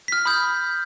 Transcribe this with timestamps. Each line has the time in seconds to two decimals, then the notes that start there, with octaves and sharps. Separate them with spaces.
0.08 F6 B6
0.25 B5 D#6 G6